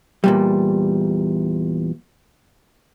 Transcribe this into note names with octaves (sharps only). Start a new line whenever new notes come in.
E2 A#2 G3